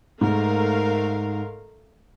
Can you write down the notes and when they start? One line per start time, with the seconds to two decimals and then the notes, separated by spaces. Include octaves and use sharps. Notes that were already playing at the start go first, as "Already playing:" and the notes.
0.21 G#2 A3 A#4 F5